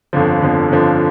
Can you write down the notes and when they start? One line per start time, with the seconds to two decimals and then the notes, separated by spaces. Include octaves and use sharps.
0.13 G1 F2 D3 F3
0.41 G1 F2 D3 F3
0.68 G1 F2 D3 F3